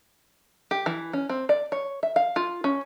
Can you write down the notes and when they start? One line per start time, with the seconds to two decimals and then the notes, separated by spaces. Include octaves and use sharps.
0.71 G4
0.86 E3
1.13 C#4
1.29 C4
1.49 D5
1.72 C#5
2.03 E5
2.16 F5
2.36 F4
2.64 C#4